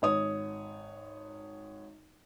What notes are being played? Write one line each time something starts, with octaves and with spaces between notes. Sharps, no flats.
G#1 C#5 D#6